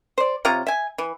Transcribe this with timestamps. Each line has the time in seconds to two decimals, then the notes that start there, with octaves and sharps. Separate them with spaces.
0.18 C5 D5
0.45 C3 F4 C#5 A#5
0.67 E5 G#5
0.98 E3